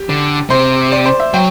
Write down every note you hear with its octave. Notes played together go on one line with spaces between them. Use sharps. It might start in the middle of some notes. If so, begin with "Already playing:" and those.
Already playing: G4
D3
C3 C5
D5
C5
E5
F#3 G5